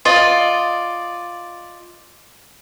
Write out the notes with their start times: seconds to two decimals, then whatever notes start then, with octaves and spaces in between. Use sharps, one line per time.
0.05 F4 D5 D#5